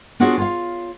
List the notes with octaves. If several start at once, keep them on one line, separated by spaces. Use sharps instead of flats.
B3 D4 F4 F#4 G#4 C#5
F4 C#5 F5